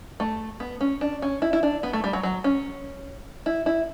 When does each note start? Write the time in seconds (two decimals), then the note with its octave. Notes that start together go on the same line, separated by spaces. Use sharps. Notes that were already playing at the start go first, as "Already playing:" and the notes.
0.20 A3
0.60 B3
0.81 C#4
1.01 D4
1.22 C#4
1.42 E4
1.53 E4
1.63 D4
1.83 B3
1.93 A3
2.04 G3
2.13 F#3
2.23 F#3
2.44 C#4
3.46 E4
3.66 E4